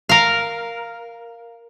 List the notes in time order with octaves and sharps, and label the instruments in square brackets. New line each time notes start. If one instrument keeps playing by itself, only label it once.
[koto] A#4 F5